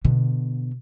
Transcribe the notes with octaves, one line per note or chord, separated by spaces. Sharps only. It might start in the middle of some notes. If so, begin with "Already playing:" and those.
B2 D3